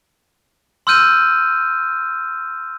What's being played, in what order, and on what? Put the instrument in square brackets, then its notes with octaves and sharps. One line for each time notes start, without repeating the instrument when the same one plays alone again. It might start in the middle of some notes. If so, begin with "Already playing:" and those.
[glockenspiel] C6 E6 F6 G6 D#7